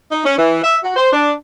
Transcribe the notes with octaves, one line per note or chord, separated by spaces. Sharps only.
D#4
C#4
E3
E5
F#4
C5
D4